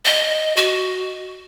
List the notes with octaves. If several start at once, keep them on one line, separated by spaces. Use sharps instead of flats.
D#5
F#4